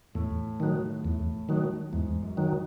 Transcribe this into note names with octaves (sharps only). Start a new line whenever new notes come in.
E2 A2
D#3 F#3
E2
D#3 F#3
E2 G#2
F#2
D#3 F#3